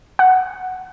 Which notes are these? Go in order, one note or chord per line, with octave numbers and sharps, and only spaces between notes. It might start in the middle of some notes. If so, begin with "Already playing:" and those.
F#5